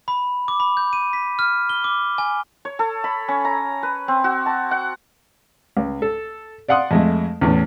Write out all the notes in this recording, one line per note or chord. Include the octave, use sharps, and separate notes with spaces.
B5
D6
B5
G6
D#7
B6
F6
G7
D6
G#5
C#5
A4
B5
C#4
A#5
B4
C4
F#4
A5
F#5
C#2
A4
D5 F5 F#5 C6 D#6
F2 G#3 A3
E2 A2 C#4